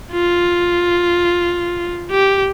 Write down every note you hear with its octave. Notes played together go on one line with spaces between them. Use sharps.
F4
G4